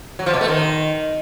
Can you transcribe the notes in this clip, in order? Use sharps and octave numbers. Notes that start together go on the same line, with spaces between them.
F#3
F3
B2
A3
D#3